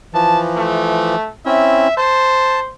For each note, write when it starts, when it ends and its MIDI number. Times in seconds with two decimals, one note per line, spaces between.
0.14 1.16 52
0.14 1.16 53
0.14 0.39 81
0.56 1.29 57
1.46 1.88 60
1.46 1.88 61
1.46 1.88 64
1.46 1.94 76
1.97 2.73 72
1.97 2.60 81